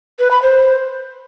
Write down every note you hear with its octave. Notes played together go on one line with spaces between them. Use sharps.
B4
B5
C5